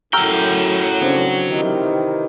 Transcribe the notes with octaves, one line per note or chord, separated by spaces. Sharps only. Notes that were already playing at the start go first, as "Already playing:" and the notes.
F#2 A2 F#3 G5 A#5 E6 F6
C#3 C4 D4
C3 D#3 E3